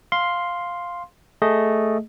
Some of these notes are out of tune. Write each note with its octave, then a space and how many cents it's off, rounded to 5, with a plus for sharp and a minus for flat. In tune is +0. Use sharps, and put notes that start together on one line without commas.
F5 +5 C6 +0
A3 +0 G#4 +0 D#5 +0